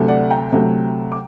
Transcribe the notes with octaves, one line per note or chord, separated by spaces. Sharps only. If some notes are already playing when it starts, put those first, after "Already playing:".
Already playing: D2 C3 F#3 A3
D5 F#5
G5 A#5
D2 C3 F#3 A3
D6